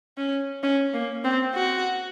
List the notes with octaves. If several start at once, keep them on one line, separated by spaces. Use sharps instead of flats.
C#4
C#4
A#3
C4
F#4